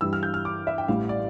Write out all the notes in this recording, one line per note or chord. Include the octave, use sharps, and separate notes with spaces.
G2 E3 G3 E6
F6
G6
F6
D6
E5
G5
A1 A2 E3 G3 F5
D5